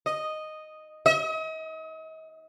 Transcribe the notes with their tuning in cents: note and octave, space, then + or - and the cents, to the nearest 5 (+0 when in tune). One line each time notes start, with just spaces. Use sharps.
D#5 -5
D#5 +40